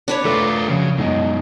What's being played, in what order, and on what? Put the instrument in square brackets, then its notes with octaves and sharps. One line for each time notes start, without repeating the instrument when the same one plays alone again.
[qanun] D4 B4 C#5
[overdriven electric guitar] A3 F4 [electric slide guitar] A4 A#4
[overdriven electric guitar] C#3 [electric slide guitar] F3 F#3
[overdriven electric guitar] F#2 B2 [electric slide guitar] G#3 D#4 D#5